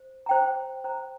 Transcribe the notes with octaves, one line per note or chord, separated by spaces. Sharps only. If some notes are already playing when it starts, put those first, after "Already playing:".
Already playing: C5
C5 G5 A#5
C5 G5 A#5